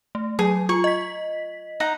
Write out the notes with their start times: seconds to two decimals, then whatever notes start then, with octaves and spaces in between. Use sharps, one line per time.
0.15 A3
0.39 F#3 G#4
0.69 F4 C#6
0.84 D#5 B6
1.80 D#4 F#5 A#5